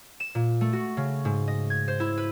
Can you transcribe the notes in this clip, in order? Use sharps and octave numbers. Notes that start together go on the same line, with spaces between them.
E7
A#2
A3
F#4
C#3
G#2
D#5
G#6
C5
E4
B4